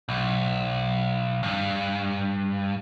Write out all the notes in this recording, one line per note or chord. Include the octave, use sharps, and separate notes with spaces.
B1
G2